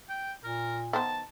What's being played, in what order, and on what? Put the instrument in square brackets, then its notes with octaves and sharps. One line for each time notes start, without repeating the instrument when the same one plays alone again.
[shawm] G5
[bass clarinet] A#2 [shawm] A#4
[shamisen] D#3 B3 C5 [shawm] A5